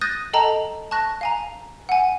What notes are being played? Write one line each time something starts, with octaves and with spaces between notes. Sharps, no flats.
D#6 F#6 G6 A6 A#6 D#7
A4 D#5 G5 A5 A#5
A5 C#6 F#6 A#6
F5 G#5 A#5
F#5 G#5